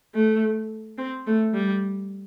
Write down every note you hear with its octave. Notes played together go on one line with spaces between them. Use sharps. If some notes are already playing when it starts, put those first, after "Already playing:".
A3
C4
A3
G3